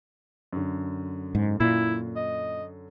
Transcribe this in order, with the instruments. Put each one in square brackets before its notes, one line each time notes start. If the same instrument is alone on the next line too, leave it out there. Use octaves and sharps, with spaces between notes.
[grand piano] F#2 D3
[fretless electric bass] G#2
[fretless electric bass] A#2 [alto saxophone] E4
[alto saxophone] D#5